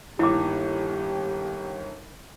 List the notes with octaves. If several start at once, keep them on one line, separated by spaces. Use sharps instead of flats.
G1 D#2 E4 G4 D6